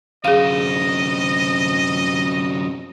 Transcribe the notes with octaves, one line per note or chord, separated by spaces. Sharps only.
F#2 C3 G#4 D#5 F5